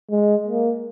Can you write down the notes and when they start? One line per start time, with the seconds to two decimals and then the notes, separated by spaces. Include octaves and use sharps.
0.11 G#3
0.47 A#3